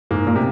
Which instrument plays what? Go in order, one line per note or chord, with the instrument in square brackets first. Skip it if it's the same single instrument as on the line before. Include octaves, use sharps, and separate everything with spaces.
[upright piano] G#2 [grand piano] A#3
[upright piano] A#2
[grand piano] C3